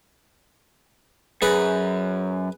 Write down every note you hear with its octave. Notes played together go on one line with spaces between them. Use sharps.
F#2 G#4 B4